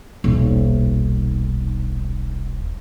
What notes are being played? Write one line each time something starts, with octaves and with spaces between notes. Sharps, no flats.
D#1 B1